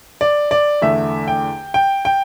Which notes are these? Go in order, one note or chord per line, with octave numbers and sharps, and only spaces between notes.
D5
D5
E2 D3 A3 E5
G5
G5
G5